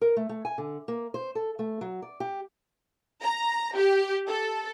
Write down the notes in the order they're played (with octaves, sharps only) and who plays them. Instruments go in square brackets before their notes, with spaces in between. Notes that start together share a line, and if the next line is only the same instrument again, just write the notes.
[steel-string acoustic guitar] A#4
A3
A3
G#5
D3
A#3
C5
A4
A3
F#3
D5
G4
[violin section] A#5
G4
A4